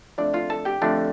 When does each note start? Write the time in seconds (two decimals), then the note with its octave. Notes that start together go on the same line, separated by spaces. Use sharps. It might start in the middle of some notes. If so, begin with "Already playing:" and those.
0.18 F2 D3 A3 D4 D5
0.34 F4 F5
0.50 A4 A5
0.65 G4 G5
0.82 F2 D3 A3 D4